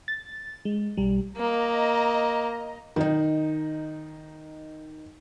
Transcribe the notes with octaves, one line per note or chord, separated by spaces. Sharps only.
A6
G#3
B1 G3
A#3 D#5 A#5
D#3 D#4